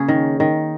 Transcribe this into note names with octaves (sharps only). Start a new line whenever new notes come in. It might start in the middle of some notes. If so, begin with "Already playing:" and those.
Already playing: C#3 A#3 G#4 C#5
D#3
D#3